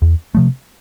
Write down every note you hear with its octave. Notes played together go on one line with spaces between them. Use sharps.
E2
C3 F3 A3